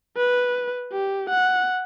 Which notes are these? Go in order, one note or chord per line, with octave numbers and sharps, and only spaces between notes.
B4
G4
F#5